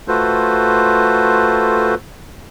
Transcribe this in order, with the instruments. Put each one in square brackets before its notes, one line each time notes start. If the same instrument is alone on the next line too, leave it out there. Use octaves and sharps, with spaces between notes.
[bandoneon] A3 F4 F#4 A4 B4 C5